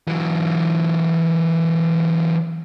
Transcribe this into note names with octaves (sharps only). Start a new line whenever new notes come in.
E3 F#3